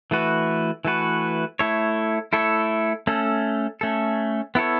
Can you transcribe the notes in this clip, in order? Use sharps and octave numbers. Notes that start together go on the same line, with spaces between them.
E3 A3 F#4 B4
E3 A3 F#4 B4
A3 E4 A4 C#5
A3 E4 A4 C#5
A3 C#4 A4
A3 C#4 A4
B3 E4 A4 C#5